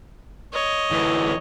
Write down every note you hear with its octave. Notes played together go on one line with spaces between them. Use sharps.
C#5 D#5
D2 E3